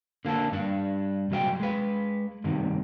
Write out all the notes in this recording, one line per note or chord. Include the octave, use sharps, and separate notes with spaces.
D3 A#3 D4 A4
G2 D4
C2 F#3 G#3 E5 G5
G#3 B4
G2 C3 D#3